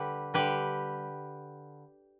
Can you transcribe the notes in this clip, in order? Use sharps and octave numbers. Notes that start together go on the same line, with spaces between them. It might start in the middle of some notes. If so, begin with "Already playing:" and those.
Already playing: D3 G3 G4 B4
D3 G3 G4 B4